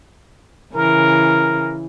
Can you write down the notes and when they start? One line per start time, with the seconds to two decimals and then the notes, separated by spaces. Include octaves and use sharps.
0.75 C#3 E3 A#4